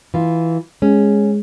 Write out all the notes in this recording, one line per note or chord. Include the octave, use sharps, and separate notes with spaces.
E3 F4
G#3 C#4